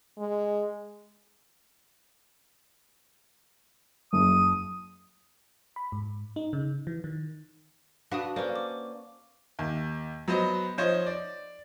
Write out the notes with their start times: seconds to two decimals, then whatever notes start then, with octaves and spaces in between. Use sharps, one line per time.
0.18 G#3
4.13 F#1 D#6
5.76 B5
5.92 G#2
6.36 D#4
6.53 C#3
6.87 E3
7.04 D#3
8.11 D4 F#4 B4 F5 A5 D#6
8.36 A#3 C#4 B4 C5 D5
8.56 D6
9.59 D#2
10.28 F#3 B3 C5 D#5
10.78 F3 C5 C#5 D#5
11.06 D5